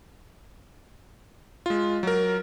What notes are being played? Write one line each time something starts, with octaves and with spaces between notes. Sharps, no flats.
G#3 F4
F#3 A#4